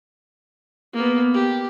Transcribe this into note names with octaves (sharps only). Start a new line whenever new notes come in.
A#3 B3
G4